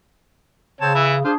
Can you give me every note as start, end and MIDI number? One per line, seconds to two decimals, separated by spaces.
0.81 1.24 49
0.81 0.95 60
0.81 0.95 73
0.81 0.95 81
0.95 1.15 52
0.95 1.15 64
1.24 1.36 62
1.24 1.32 65
1.24 1.36 68
1.24 1.32 72